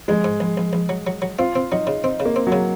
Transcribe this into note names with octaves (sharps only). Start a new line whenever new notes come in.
A#1 G#3
G#2
A#1
A#1
A#1
F#3
F#3
F#3
C4 F4
C4
F#3 D#4
C#3
C4 D#4
C#3
A#3
C4
F#3
C#3